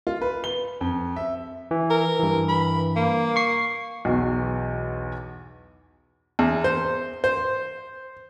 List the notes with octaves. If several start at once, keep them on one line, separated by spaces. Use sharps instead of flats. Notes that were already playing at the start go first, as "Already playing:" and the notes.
F4
B4
G7
F2
E5
E3
A#4
G2 E3
B5
A#3
C#6 C7
B1 E2 F#4
E2
C5
C5